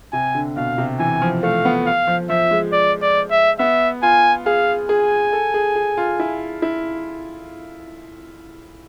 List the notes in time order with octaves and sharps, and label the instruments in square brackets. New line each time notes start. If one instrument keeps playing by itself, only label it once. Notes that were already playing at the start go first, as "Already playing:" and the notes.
[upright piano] C3 [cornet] G#5
[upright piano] D3
[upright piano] B2 [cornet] F5
[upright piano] C3
[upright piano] E3 [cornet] G#5
[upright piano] F3
[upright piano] A3 [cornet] F5
[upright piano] B3
[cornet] F5
[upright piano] F3
[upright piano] F3 [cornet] E5
[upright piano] G#3
[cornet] D5
D5
E5
[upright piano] B3 [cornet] E5
[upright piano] F4 [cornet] G#5
[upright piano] G#4 [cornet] F5
[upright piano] G#4 [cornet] G#5
[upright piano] A4
G#4
G#4
F4
E4
E4